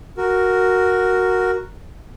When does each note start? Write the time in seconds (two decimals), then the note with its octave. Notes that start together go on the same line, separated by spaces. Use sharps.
0.17 F#4 A#4